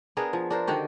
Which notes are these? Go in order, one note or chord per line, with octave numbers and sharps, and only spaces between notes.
B3 D4 G#4 A#4
F3
D4 A#4 C5
D3 D#3 F#4 G4